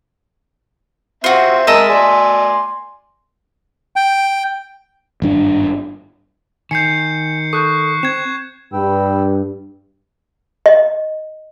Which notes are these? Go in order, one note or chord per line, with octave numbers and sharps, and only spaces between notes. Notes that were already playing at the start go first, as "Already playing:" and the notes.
C4 F4 F#4 E5
G#3 A#4 D#5 E5 A5
D5 G#5 C6
G5
G#1 G2 D4
D#3 G#5 G6 C7 C#7
A4 C#6 D#6 F#6 G6
C4 G#6 E7
G2 B4 G5 E6
D#5